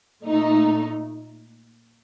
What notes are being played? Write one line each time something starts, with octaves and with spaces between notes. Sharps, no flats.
A#2 A3 D#4